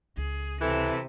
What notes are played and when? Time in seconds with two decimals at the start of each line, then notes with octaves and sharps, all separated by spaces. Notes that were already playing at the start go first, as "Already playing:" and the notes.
0.17 C#2 G#4
0.61 C3 E3 E4 A4